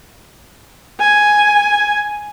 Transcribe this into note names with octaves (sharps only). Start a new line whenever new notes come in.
G#5